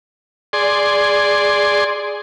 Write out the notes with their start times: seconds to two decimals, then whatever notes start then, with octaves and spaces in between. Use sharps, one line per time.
0.53 G#4 D5 C6